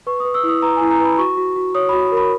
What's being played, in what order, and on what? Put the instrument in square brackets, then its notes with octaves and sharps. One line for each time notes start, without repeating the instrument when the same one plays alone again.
[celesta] B4 C#6
B4 D#6
E6
E4 D#6
B4 A#5
E4 G#5
A#5
B4 B5
F#4 C#6
F#4
F#4
C#5 D#6
F#4 B5
A#4
B5